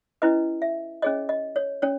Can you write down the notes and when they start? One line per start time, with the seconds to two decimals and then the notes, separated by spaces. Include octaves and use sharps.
0.22 C#4 E4 B4 D#5
0.62 E5
1.02 C#4 G#4 C#5 D#5
1.29 D#5
1.56 C#5
1.82 C#4 C#5